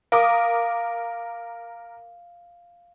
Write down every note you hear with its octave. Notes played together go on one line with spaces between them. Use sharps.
A#4 F5 D6 D#6